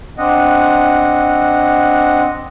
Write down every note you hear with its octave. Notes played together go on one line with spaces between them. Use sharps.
C4 D4 D#5 F#5